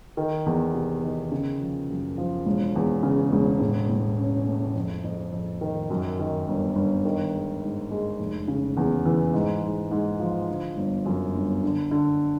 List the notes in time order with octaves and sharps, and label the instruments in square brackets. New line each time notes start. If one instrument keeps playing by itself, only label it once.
[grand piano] D#3
E2
C3
D#3
C#3
F3
F#2
F3
E1
E2
C#3
E1
A2
A2
C#4
A3
F2
F2
F2
D#3
F#2
D#3
G1
G1
D#3
G#3
G#2
G#3
F1
C#3
E2
E3
G#2
G#2
G#2
F3
D3
G1
F#2
G1
D3
D3